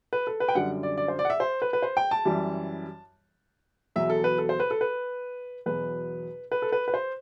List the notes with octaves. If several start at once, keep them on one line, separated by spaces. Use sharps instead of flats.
B4
A4
B4
G5
F#2 D3 G3 F#5
D5
D5
C5
D5
F#5
E5
C5
B4
B4
C5
G5
A5
F#2 E3 G3
E2 B2 F#3 E5
A4
B4
A4
C5
B4
A4
B4
E2 B2 F#3 B4
B4
A4
B4
B4
C5